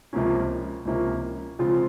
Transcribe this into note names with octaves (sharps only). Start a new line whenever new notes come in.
C#2 C3 F3 A#3 C#4
C#2 C3 F3 A#3 C#4
C#3 F3 G#3 C4 F4